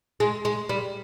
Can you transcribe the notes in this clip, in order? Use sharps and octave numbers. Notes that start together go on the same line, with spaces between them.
G#3
G#3
G3